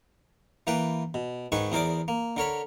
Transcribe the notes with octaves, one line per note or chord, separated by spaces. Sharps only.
E3 A#3 B4 G5
B2
G#2 D#3 G#4 B4 C#6
E2 G#4 A#4 C5 D5 D6
A#3
D3 A#4 C#5 B5